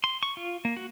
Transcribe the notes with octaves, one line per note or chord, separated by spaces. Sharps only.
C6
C#6
F4
A#3
F#4